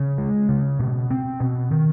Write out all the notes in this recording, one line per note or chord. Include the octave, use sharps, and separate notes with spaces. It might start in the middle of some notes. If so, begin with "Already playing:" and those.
Already playing: C#3
G#3
C#3
B2
C4
B2
D#3